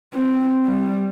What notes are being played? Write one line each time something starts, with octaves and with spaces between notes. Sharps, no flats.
C4
G3